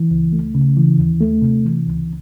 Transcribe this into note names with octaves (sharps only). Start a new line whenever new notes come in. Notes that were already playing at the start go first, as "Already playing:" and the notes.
Already playing: E3
C#2
A3
C#3
E3
D#2
A3
C3
E3
C#2